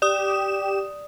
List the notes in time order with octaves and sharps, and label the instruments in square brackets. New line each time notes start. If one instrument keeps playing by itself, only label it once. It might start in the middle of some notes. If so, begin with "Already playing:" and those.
[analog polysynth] G4 E7 [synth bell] D5 D#6